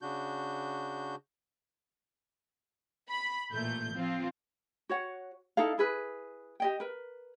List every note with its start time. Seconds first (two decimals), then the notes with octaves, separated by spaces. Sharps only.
0.02 C#3 D4 F#4 G6
3.09 B5
3.53 A1 A#2 A3 G6
3.95 F3 C4 F4
4.89 F#4 C#5 F#5
5.57 D#4 E4 A4 F5
5.78 E4 G#4 B4
6.60 G4 D#5 G5
6.80 A#4 B4